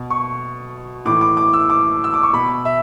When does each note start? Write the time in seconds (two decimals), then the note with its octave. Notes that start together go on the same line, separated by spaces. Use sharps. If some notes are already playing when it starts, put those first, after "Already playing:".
Already playing: B2
0.10 C#6
1.05 A2 E3 D6
1.21 D6
1.37 D6
1.53 E6
1.70 D6
2.04 E6
2.14 D6
2.23 C#6
2.33 B2 B5
2.65 E5